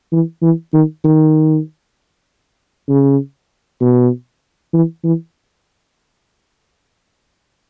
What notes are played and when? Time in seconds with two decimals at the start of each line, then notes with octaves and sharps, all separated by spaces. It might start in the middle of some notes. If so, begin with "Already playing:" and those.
0.12 E3
0.42 E3
0.73 D#3
1.04 D#3
2.89 C#3
3.81 B2
4.73 E3
5.04 E3